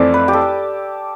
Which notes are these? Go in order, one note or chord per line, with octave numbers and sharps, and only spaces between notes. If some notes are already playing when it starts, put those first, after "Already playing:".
Already playing: F2 E3 A3 C4 E4 D5
B4
G4
A4